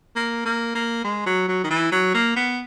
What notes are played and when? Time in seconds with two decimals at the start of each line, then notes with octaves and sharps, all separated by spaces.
0.16 A#3
0.45 A#3
0.75 A#3
1.04 G#3
1.26 F#3
1.48 F#3
1.64 D#3
1.71 E3
1.92 F#3
2.14 A#3
2.36 B3